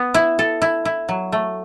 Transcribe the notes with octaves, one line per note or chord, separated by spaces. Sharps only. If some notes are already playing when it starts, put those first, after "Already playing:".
Already playing: B3
E4
A4
E4
E4
F#3
A3